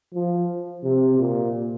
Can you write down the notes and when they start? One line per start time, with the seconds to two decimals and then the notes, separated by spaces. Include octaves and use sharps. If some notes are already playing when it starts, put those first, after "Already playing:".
0.14 F3
0.83 C3
1.19 A#2